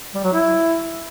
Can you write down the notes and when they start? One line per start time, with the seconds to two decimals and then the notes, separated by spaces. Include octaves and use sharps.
0.15 G3
0.24 F#3
0.33 E4